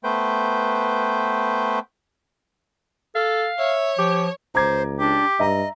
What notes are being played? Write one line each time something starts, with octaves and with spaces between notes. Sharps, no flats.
A3 B3 B4 C5 G5
A4 F5
C#5 E5
F3 G4
C#2 C5 A#5 D6 G#6
D4 G4
G2 D#5 E5 A#5